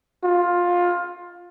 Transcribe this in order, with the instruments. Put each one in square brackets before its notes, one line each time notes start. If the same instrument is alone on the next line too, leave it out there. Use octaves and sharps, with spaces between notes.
[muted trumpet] F4